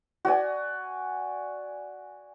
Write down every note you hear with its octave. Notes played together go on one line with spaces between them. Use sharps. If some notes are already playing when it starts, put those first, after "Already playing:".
F#4 D5 G#5